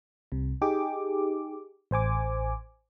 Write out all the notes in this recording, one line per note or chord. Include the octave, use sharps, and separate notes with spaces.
C2 C3
D#4 G4 G#4 D6
A1 C5 G#5 D6